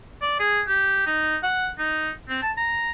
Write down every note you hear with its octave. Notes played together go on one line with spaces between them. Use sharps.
D5
G#4
G4
D#4
F#5
D#4
C4
A5
A#5